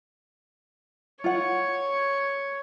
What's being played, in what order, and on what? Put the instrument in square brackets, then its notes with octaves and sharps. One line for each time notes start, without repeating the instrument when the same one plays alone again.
[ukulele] F4 F#5 [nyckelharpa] C#5